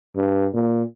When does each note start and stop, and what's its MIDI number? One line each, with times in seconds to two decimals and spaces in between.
0.17 0.47 43
0.54 0.83 46